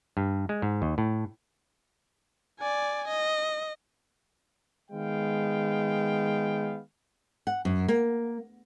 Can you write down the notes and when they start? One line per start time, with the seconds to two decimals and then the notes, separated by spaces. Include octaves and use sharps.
0.17 G2
0.49 G#3
0.62 G#2
0.82 D#2
0.98 A2
2.59 D5 G#5
3.08 D#5
4.91 D#3 G#3 B3 F5 G5
7.47 F#5
7.65 F#2
7.88 A#3